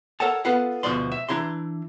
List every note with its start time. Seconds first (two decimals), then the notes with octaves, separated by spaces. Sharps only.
0.20 A4 A#4 C#5 F#5 A5
0.45 B3 F4 A4 B4 F5 F#5
0.83 D2 B2 F3 G#3 D5 C6
1.12 E5
1.29 E3 D4 E4 A#5 C6